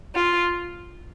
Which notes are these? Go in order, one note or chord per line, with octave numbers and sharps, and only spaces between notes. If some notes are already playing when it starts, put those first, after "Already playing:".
F4